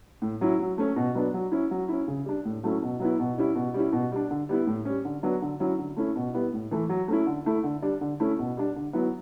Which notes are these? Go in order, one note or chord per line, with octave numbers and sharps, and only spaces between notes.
A2
F#3 C#4 E4
F#3
A3 C#4
B2
F#3 B3 D4
F#3
C#4 E4
F#3
C#4 E4
C#3
G3 D4
A2
F#3 A3 C#4 E4
B2
F#3 B3 E4
B2
G3 C#4 E4
B2
G3 C#4 E4
B2
G3 D4
D3
G3 B3 E4
A2
G3 C#4
D3
F#3 B3 D4
D3
F#3 C#4 E4
D3
A3 C#4 E4
B2
G3 B3 E4
A2
E3 A3 E4
F#3
A3 C#4 E4
D3
A3 E4
D3
G3 D4
D3
A3 C#4 E4
B2
G3 D4
D3
F#3 B3 E4